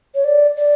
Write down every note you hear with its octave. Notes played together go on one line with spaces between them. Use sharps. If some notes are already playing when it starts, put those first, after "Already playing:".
C#5
D5
D5